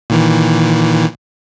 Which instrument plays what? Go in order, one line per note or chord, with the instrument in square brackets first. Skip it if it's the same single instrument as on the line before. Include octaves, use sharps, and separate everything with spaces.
[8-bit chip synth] A#2 D#3 E3